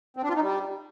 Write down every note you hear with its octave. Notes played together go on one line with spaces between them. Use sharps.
C4
D4
F4
D#4
G3